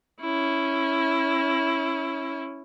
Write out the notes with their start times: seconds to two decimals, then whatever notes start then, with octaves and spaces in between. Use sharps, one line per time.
0.20 C#4 E4